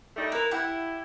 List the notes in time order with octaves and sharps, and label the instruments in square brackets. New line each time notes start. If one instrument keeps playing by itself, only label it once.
[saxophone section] G3 A3 D#4
[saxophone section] E4 A#4 [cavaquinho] B4
[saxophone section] E4 [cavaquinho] G4 F#5